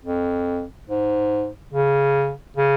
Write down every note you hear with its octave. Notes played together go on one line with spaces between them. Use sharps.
F2
G#2
C#3
C#3